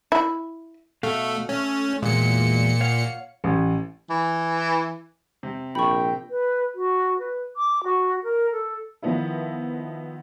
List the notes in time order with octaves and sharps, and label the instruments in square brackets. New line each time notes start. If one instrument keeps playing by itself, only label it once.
[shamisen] E4
[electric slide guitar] B2 F5 [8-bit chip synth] A3
[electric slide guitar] A3 [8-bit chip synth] C#4
[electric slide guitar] E2 F#3 G#3 [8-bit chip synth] A#2 C#7
[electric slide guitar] C#5 F5 F#5
[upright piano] A1
[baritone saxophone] E3
[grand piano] C3
[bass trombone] A#1 [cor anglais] G5 [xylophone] B5 C#6
[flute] B4
F#4
B4
D6
F#4
A#4
A4
[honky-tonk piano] D#3 F3 B3 D#4 E4